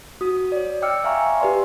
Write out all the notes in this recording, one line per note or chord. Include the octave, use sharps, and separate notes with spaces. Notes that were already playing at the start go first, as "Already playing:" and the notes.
F#4 D#6
C#5 D5
D#5 G5 D6 E6 F6 C#7
E5 F5 G#5 A#5 C#6
G4 B4 D5 C6